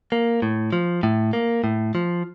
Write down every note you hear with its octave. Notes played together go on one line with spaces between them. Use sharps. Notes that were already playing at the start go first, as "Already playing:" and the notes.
A#3
A2
F3
A2
A#3
A2
F3